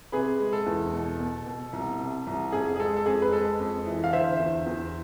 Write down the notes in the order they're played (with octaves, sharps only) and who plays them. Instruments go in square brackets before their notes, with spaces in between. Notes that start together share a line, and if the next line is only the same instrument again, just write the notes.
[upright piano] C3 G#4 B4
G#3
A4
E2
B2
B2
B2
C2
C3
C2
F2 G#4
G#4
G#3 A4
A4
F2 G#4
B4
G#3 A4
F2
E3
F5
D3 C5 E5
E2
E2